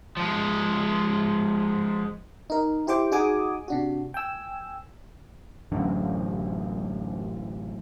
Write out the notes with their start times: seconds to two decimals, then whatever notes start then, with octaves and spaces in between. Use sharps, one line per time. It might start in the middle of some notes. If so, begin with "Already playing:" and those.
0.17 F3 G#3
2.50 D#4 A#4
2.87 E4 G4 C5 G5 D6
3.12 D#4 F#4 G#4 G#5 D6 D#6
3.68 C3 D4 F#4
4.14 G5 G#5 E6
5.72 A1 F#2 D3